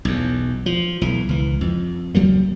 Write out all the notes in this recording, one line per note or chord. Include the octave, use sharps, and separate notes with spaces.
B1 E2
F3
B1 E3
C#2 E3
F2
C#2 F#3 G3 A#3